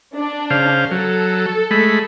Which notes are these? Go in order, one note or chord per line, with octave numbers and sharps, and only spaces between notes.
D4
C#3 C5 F5
F#3 A4
G#3 A3 B5